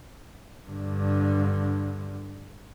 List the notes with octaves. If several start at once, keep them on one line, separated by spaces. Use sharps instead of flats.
G2 D3